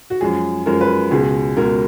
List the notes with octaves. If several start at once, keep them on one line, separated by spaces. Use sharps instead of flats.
F#4
F#2 F3 G#3 G#4
F#2 F3 G#3 A#4
B4
C#2 B2 G#3 G#4
C#2 B2 G#3 A#4